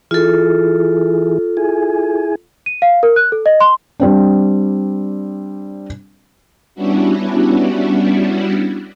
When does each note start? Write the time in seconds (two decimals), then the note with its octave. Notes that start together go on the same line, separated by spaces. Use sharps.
0.11 E3 E4 F4 G#4 A4
1.57 E4 G#4 G#5
2.66 D#7
2.82 F5
3.03 A#4
3.16 F#6
3.32 A4
3.46 D#5
3.61 C6
4.00 G3 C4 D4
6.75 G3 B3 C#4 D4 E4 F#4